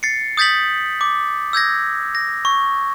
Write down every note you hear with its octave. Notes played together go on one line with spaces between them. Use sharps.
A6 C7 C#7
D#6 G6 A6 B6 F#7
D6
E6 G6 G#6 A#6
A#6
C#6